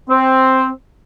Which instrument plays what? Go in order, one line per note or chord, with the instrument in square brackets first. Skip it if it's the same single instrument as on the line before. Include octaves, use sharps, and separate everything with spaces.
[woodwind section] C4